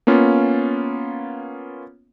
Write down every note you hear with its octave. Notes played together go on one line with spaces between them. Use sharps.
A#3 B3 C#4 F4